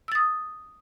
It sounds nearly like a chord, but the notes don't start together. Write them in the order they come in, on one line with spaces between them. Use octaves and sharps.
E6 A6 D#6